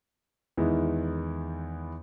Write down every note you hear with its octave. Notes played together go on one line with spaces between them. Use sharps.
E2 D#3 G#3 B3 E4